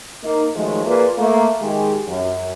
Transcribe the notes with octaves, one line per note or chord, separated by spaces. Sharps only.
A#3 D#4
D#3 F3 F#3 G#3 A3
A#3 F4 G#4 B4 D5
A3 A#3
D#3 G#3 G4 G#4
F#2